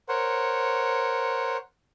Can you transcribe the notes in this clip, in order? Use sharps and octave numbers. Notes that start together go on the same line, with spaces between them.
A#4 C5 C#5 F#5